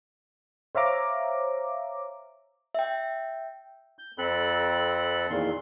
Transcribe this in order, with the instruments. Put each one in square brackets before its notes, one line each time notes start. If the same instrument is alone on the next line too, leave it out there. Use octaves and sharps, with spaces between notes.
[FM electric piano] C5 C#5 E5 F5 A#5 D6
[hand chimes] E5 G5
[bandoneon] G6
F2 C4 A4 B5 F#6
E2 A#2 D#3 C6